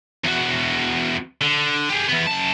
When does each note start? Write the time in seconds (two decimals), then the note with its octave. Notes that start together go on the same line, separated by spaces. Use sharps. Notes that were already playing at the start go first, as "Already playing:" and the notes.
0.24 E2 F#4
1.41 D3
1.90 G4 G#4
2.09 E3 B3
2.27 F#2 A5